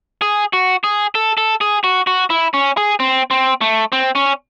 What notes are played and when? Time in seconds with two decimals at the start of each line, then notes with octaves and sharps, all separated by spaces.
0.22 G#4
0.53 F#4
0.84 G#4
1.15 A4
1.38 A4
1.61 G#4
1.84 F#4
2.07 F#4
2.30 E4
2.54 C#4
2.77 G#4
3.00 C4
3.31 C4
3.61 A3
3.92 C4
4.15 C#4